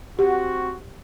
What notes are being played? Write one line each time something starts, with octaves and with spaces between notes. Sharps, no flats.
C4 F#4 G4